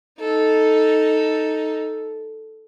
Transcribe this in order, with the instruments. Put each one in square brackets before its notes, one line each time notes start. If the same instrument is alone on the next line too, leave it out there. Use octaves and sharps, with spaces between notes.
[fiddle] D#4 A4